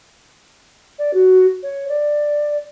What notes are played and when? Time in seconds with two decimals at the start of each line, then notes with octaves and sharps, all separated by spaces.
0.98 D5
1.14 F#4
1.63 C#5
1.89 D5